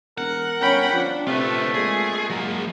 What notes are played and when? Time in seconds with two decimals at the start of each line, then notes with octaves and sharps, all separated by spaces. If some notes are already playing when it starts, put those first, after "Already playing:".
0.18 E1 A#4 F#5
0.61 G1 C#4 G5 B5
0.93 F3 D4
1.27 C3 A3 F4 B4
1.74 A#2 G#3 G#4
2.30 F#3 A#3